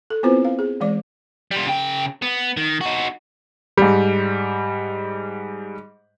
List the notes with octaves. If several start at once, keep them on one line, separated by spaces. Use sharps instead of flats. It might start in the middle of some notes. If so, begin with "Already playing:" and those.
A4
B3 C4 E4 F4 B4 C5
F5
G#4
E3 G#3 D5 D6
G3 F4
C#3 G5
B3
D#3
D#4 F#4
G#2 G3